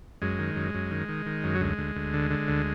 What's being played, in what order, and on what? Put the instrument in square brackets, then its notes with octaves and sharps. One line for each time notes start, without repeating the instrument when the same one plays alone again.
[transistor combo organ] F#2 G#3
D#3
F#2
F#2
D#3
D#3
D#3
F#2
F#3
D2 G#3
D2
D2
D3
D3
D2